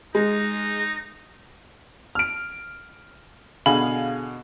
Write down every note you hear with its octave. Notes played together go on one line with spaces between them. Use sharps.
G#3 D#4
F6 D7
B2 D3 G#4 F5 B5